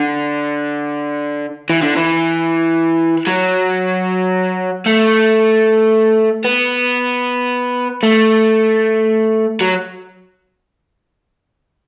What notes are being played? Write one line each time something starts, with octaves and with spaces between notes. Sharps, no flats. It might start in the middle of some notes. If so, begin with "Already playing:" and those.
Already playing: D3
E3
D3
E3
F#3
A3
B3
A3
F#3